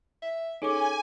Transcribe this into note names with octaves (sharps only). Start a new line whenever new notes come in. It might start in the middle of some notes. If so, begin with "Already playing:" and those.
E5
C#4 D#4 G#4 A4 C#5 G#5 D6